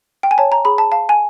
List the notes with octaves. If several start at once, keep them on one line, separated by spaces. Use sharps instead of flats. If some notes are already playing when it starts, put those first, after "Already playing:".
G5
G#5
C#5 A5
A#5
G#4 B5
A5
F5 A5
G#5